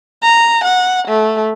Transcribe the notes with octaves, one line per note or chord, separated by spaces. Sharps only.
A#5
F#5
A3